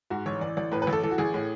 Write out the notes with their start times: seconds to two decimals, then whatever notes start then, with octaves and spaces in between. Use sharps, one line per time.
0.10 G#2 F#4
0.26 A1 C#5
0.41 E3 D5
0.57 A1 D5
0.72 A2 B4
0.82 B4
0.87 A1
0.93 A4
1.03 E3 A4
1.11 F#4
1.18 A1 G#4
1.34 A2